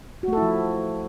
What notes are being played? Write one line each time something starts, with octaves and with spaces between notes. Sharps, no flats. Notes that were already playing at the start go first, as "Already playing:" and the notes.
F3 A3 E4 F#4 A4